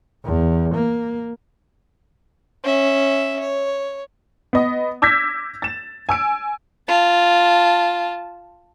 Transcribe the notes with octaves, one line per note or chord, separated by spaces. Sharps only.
E2
A#3
C#4 E5
C#5
B3 D#5
D6 E6 G6 G#6 A#6 B6
A6 E7
G#5 E6 D7
F4 A5